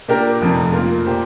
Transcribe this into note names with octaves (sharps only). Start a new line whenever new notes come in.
A#2 A#3 D4 G4 A#4
F1 F2 C3
A#2 A#3 F4 A#4
A#2 A#3 G4 C5